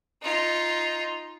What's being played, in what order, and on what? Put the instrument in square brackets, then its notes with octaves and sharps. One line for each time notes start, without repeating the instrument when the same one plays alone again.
[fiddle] D#4 F4